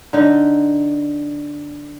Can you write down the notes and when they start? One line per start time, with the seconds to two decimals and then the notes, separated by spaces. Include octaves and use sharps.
0.13 D3 D#4